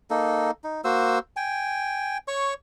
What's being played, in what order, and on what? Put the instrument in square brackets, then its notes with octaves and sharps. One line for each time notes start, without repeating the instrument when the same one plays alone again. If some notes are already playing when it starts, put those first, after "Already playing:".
[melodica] A#3 D#4 A4
D#4
A#3 F#4 C5 E6
G5 G#5
C#5 C#6